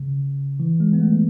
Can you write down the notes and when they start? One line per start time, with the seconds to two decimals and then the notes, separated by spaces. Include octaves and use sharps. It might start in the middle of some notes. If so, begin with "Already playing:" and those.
Already playing: C#3
0.60 E3
0.80 G#3
0.93 B3
1.00 A3